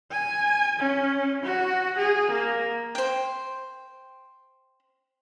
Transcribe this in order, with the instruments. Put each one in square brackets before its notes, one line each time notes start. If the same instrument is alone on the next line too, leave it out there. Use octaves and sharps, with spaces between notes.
[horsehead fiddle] G#5
C#4
F#4
G#4
A#3
[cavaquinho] C5 G5